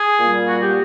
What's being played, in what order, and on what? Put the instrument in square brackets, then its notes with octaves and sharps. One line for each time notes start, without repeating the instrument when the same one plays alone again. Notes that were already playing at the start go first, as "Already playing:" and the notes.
Already playing: [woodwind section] G#4
A#2 G3 A#3
F#4
G4